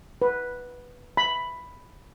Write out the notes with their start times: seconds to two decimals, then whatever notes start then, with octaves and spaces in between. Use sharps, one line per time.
0.22 B4
1.17 B5